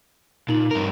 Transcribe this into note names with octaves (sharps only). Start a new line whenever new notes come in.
A#2 D#4 F#7
G2 A#4